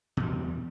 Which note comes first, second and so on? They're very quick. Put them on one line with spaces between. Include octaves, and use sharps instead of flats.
B2 E2 G3